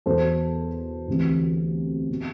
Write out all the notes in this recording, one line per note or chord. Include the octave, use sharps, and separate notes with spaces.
E2 B2 A4 C5
D2 C3 E3
B2